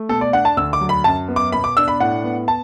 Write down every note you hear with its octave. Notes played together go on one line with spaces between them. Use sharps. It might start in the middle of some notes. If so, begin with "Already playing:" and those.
Already playing: A3
B2 A4
D5
D4 F#5
A5
D2 E6
D6
F#3
B5
F#2 A5
B3
D6
B2 B5
D6
D4 E6
B5
A2 F#5
B3
A5